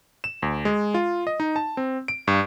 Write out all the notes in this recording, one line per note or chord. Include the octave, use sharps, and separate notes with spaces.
E7
D2
G#3
F4
D#5
D#4
A5
C4
D7
G2